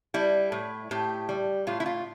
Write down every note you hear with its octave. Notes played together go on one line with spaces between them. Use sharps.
G3 E4
A2
A2 G4
G3
A2 F4
E4
F4